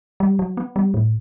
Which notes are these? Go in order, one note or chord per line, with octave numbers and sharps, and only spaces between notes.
G3
F#3
B3
G3
A2